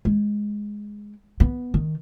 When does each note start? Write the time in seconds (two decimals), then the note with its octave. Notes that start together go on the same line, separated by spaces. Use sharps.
0.05 G#3
1.40 B3
1.74 D#3